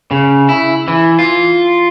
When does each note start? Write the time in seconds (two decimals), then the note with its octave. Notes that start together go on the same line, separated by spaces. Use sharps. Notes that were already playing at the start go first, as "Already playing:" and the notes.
0.11 C#3
0.49 E4
0.88 E3
1.19 F4